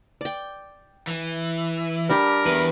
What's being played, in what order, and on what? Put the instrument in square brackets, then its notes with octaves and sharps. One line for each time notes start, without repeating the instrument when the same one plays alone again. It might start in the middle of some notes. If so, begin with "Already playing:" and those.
[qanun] D5 G5
[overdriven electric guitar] E3
[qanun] G3 D4 G4 [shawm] A#4
[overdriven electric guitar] E2 E3 [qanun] B4